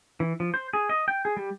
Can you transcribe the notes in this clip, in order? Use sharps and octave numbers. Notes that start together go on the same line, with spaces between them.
E3
F3
C5
G#4
D#5
G5
G#4
G3